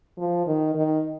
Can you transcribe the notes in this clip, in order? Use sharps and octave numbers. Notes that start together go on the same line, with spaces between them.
F3
D#3
D#3